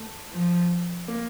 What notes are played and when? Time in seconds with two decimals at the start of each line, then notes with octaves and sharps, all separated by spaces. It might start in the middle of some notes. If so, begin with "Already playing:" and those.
Already playing: A3
0.31 F3
1.08 A#3